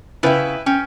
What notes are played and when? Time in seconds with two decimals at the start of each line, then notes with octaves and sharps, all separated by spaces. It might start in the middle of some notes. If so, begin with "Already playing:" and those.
0.23 C#3 E4 B4 E5 G5
0.66 C#4 G5